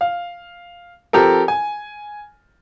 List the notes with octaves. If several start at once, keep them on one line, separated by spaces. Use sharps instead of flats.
F5
F3 C4 G4 A4 A#4
G#5